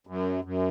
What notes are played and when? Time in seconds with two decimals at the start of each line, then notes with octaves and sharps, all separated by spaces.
0.07 F#2
0.44 F#2